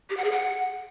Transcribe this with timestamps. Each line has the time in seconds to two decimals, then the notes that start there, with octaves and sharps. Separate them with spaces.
0.10 G4
0.17 F#5
0.24 G#4
0.32 F#5